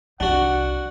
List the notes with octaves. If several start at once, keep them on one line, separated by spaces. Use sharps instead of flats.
C2 D4 D#4 F#4 F#5